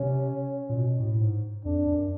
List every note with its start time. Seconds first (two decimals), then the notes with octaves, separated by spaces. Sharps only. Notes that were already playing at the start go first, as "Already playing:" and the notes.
Already playing: C3 C#4
0.69 A#2
0.76 B2
0.99 A2
1.21 G#2
1.65 F2 D4
1.86 F#2